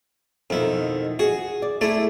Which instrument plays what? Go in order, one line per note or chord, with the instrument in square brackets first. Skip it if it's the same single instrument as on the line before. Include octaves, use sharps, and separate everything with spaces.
[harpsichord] F2 E4 [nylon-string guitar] B2 D#3
[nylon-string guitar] F#4 [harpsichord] G#4
[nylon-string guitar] D5
[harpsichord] A3 D5 [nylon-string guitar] E4 G#4